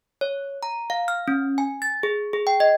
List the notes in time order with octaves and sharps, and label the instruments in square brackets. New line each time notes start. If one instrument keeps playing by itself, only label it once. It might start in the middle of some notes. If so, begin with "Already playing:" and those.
[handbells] C#5
A#5
F5
F6
C#4
G#5
A6
G#4
G#4
G5
D#5